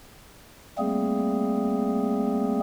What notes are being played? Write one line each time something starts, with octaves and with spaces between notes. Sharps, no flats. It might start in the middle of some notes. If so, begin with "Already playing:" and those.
G3 A3 A#3 C4 G#4